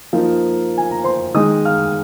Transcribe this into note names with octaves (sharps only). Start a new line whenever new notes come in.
F3 A#3 D#4
G#5
A#5
C5 C6
D#3 G#3 D#4 D#5 D#6
F5 F6